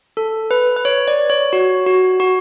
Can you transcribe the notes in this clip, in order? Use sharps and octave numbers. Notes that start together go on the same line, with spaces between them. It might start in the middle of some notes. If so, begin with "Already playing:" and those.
A4
B4
B4
C#5
D5
C#5
F#4
F#4
F#4